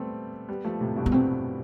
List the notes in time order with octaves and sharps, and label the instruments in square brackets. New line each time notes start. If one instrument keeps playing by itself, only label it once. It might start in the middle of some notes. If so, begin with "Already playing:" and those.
Already playing: [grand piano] G3 A3 B3 C4
G3 B3
F3 A3
A2 C3
G2 B2
[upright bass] B3
[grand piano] A2 C3 [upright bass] C4